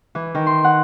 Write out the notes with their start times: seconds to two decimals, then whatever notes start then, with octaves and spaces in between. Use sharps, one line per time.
0.15 E3
0.35 D#3
0.46 C6
0.64 F#5